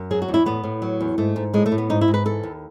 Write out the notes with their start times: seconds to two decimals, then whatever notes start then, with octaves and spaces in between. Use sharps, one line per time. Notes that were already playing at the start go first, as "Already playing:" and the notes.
Already playing: F#2
0.11 F#3 G#4
0.22 F#4
0.28 E2
0.34 E4
0.46 A2 B3
0.64 A2
0.82 F#3
1.01 E2
1.18 G#2 A3
1.36 G#2
1.54 A2 G#3
1.66 A3
1.72 A2
1.78 B3
1.90 G#2 D#4
2.01 E4
2.08 G#2
2.14 B4
2.25 E3 A4
2.43 D#2